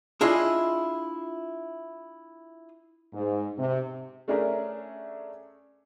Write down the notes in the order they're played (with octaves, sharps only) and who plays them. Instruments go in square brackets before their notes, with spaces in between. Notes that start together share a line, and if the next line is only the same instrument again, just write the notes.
[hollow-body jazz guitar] D4 E4 F4 G#4 D#5
[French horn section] G#2
C3
[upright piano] A3 C#4 D4 G#4 A#4 E5